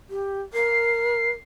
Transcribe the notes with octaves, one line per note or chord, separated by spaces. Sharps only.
G4
A#4 C7